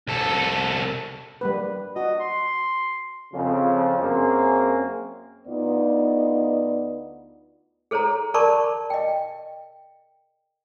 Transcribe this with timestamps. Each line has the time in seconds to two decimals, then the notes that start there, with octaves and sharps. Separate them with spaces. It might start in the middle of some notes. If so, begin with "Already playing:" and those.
0.08 C2 A4
1.41 G3 A#3 B4
1.96 F#4 D#5
2.20 C6
3.33 F2 C#3
3.99 F#2 A#3 C4 C#4 G#4
5.48 D2 B3 D#4 F4 D5 D#5
7.91 G#4 A4 C5 C#5 A#5
8.34 A#4 D5 A5 B5 C#6 D6
8.90 D#5 G5